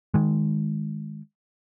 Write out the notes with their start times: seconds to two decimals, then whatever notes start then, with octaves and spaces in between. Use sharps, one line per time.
0.14 D#3 G#3